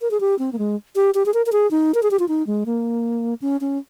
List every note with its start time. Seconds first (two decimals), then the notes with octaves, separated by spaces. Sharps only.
0.01 A#4
0.11 G#4
0.20 G4
0.39 C4
0.53 A#3
0.58 G#3
0.96 G4
1.15 G4
1.26 G#4
1.34 A#4
1.46 A#4
1.52 G#4
1.71 D#4
1.94 A#4
2.03 G#4
2.11 G4
2.19 F4
2.28 D#4
2.47 G#3
2.66 A#3
3.42 C#4
3.61 C#4